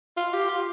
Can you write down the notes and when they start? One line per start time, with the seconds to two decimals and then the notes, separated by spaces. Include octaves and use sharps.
0.17 F4
0.33 G4
0.49 F4